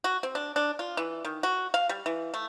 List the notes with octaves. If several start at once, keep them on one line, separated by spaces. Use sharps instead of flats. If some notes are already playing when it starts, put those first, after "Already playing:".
F#4
C4
D4
D4
F4
E3
D#3
F#4
F5
G3
E3
A3